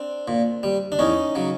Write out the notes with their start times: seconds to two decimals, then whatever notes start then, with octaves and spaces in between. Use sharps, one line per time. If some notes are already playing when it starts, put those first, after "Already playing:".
Already playing: C4 D4
0.28 A#2
0.63 G3
0.92 D4
0.99 E2 C#4 D#4
1.35 C#3 F#3